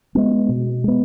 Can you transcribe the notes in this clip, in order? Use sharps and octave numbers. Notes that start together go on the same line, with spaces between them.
G#3 B3
B2
G#3 B3